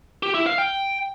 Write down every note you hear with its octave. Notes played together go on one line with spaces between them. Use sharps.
G4
E4
F5
G5